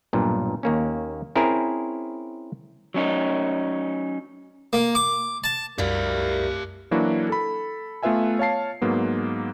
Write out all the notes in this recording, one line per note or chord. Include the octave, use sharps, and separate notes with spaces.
B1 G2 A#2
D#2 A#3 C#4
C4 C#4 E4 G#4 A#4
F#3 C#4 D#4
A#3
D6
A5
C2 F#2 F#3 G3 E4 G4 A#4 F5
E3 F#3 A#3 D4 E4 F#4
A4 B5
A3 B3 F4 B4 E5 G#5
C#5 F5 A5 C7
G#2 F#3 A#3 B3